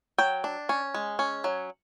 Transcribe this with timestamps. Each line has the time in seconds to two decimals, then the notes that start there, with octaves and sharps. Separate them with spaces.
0.18 F#3 G5
0.44 D4
0.69 C#4
0.94 G#3
1.19 C#4
1.44 F#3